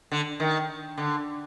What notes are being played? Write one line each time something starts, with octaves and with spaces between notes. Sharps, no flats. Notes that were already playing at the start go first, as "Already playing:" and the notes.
D3
D#3
D3